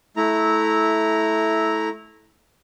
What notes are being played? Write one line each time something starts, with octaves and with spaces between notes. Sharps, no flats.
A3 E4 A#5